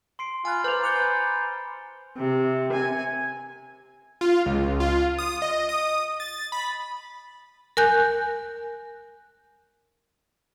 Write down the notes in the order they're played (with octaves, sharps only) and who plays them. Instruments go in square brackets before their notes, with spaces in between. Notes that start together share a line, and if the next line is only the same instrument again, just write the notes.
[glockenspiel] C6 C7 D7
[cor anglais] F4 [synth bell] G#5 F#6 [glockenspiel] B5 F6
[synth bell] B4 F7 [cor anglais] C5 [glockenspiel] A#5 D6 A6
[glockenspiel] G#5 C#7 G7 [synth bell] D6 F#6 G6
[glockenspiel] G#5 A#5 B5
[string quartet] C3
G#5
[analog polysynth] F4
C#2
F4
D#6
D#5
D#6
A6
B5
[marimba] A#4 G#5 F#6 G6